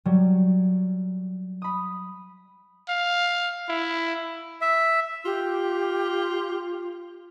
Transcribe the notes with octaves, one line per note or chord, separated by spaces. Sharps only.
F#3 G3
B5 D#6
F5
E4
E5
F4 G4